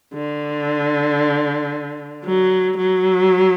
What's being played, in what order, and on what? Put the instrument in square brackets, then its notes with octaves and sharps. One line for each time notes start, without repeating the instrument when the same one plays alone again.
[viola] D3
F#3
F#3